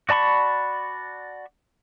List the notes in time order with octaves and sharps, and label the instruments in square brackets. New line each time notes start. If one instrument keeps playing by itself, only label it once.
[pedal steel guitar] F#4 D5 A5 B5 C#6